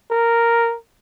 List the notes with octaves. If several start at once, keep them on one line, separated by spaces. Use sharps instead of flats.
A#4